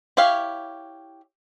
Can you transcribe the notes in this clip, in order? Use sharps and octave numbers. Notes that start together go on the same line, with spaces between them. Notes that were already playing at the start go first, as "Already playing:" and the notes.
E4 G4 C#5 F5